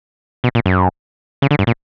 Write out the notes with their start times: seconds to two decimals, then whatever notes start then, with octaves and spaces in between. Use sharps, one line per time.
0.44 B2
0.55 A#2
0.66 F#2
1.42 C#3
1.51 D3
1.59 G2
1.67 A#2